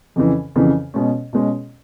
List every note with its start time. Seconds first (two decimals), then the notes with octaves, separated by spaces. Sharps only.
0.16 F2 C#3 E3
0.56 F2 C#3 E3
0.94 B2 G#3 C#4
1.33 B2 G#3 C#4